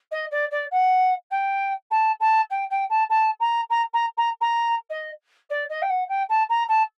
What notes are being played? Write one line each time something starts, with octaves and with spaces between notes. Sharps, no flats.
D#5
D5
D5
F#5
G5
A5
A5
G5
G5
A5
A5
A#5
A#5
A#5
A#5
A#5
D#5
D5
D#5
G5
F#5
G5
A5
A#5
A5